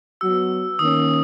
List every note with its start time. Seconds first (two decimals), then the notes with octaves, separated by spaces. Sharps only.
0.21 F#3 B3 F#4 E6
0.79 D#3 A#3 C#4 D#6